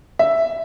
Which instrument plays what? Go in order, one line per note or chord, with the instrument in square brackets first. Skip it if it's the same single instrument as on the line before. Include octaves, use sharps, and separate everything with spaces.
[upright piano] E5